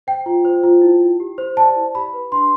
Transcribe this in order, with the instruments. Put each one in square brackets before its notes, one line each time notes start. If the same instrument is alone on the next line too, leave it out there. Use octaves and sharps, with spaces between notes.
[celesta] C5 G5
F4
C5
F4
E4
E4
G4
C5
D5 A5
E4
G4 B5
B4
D4 C6